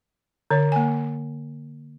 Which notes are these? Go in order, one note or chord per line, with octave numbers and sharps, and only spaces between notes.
D3 C#5
A#3 G#5